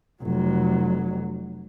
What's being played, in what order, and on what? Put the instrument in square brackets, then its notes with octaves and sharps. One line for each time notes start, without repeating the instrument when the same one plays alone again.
[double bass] F1 F#3